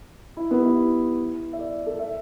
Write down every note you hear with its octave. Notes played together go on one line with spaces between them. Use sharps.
E4
B3
G4
E4
E5
D5
A4
E5